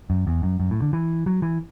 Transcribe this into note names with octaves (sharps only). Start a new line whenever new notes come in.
F#2
E2
F#2
F#2
A2
D3
E3
F#3
E3